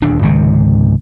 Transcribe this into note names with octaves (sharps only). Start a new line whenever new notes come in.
D#1 D2 D4
G#1 C#2 C3 D#3